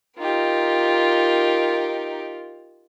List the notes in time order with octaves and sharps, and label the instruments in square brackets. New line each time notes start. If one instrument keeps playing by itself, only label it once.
[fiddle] D#4 G4 [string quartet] F4 A#4